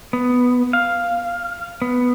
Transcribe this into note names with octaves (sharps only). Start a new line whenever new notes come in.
B3
F5
B3